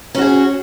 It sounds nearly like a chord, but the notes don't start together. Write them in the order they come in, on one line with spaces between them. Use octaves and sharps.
C#4 F#4 G#4